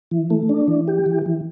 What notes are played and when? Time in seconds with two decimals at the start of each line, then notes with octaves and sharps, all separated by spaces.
0.11 E3
0.30 A3
0.49 D4
0.68 E3
0.88 G4
1.06 E3
1.26 E3